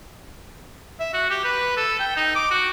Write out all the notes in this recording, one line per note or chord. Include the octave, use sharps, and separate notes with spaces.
E5
F#4
G4
B4
A4
G5
D#4
D6
F#4